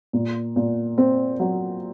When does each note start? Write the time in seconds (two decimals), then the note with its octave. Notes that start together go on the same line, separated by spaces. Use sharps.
0.13 A#2
0.56 A#2
0.98 C4
1.39 F#3